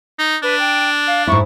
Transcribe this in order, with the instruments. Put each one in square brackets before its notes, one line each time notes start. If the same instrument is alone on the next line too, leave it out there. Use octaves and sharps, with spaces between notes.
[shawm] D#4
[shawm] D4 [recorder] B4
[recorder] G5
F5
[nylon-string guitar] G#2 E4 [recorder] C#6